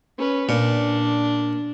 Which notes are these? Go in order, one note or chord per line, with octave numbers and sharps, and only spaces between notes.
C#4 B4
A#2 D4